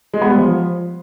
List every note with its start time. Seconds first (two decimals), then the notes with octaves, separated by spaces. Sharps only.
0.14 G#3
0.22 B3
0.30 G3
0.38 F3